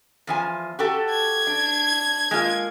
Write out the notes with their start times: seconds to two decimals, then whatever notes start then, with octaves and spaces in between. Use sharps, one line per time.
0.27 E2 F3 G#5
0.79 F#4 G4 A4
1.10 G#6
1.47 D4
2.31 G#3 A#3 F4